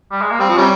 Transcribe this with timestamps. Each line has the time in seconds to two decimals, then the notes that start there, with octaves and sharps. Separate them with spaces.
0.12 G3
0.21 G#3
0.31 A#3
0.40 G3 C4
0.49 F3
0.57 C3 G3 C#4